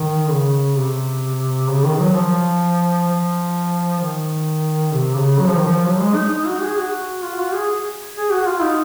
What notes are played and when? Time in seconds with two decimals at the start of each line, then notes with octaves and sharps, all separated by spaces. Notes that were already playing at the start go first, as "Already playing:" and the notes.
Already playing: D#3
0.30 C#3
0.77 C3
1.69 C#3
1.84 D#3
2.00 F#3
2.15 F3
3.08 F3
4.00 D#3
4.92 C3
5.16 C#3
5.38 F#3
5.48 F3
5.57 D#3
5.65 F3
5.85 F#3
6.00 G#3
6.15 D#4
6.31 D#4
6.47 F#4
6.62 G#4
6.78 F#4
7.24 F4
7.39 F#4
7.54 G#4
8.16 G#4
8.31 F#4
8.47 F4
8.62 D#4